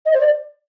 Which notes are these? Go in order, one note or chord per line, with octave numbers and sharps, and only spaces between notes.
D#5
C5
D5